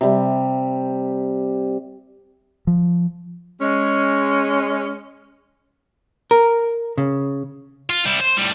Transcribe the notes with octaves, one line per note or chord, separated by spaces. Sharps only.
C3 G3
F3
G#3 C#4
A#4
C#3
F4
G3 E4
C5
A2 G3